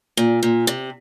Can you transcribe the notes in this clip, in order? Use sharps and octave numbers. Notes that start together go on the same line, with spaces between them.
A#2
A#2
C3